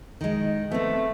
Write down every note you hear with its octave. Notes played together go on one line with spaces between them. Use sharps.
D#3 G#3
A3 B3 C4